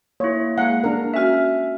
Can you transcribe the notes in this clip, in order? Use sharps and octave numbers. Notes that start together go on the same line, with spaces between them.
A#3 E4 C#5
G#3 A#3 G#4 F5 F#5
D4 A#4
C#4 F#4 E5 G#5 F6